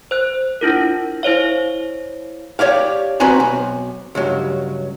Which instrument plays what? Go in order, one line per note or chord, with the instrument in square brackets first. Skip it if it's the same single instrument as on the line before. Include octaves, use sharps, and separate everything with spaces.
[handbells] C5 F#6
D4 E4 F4 A#4
E4 C5 C#5 F5
[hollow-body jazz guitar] G4 C#5 D5 F5
C4 F#4 B4 G#5 A#5
B1
C#2 G2 F#3